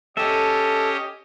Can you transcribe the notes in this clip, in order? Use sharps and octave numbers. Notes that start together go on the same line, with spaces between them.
C#4 G4 A4 D#5 E5